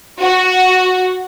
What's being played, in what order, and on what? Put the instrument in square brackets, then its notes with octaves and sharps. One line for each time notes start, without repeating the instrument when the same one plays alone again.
[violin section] F#4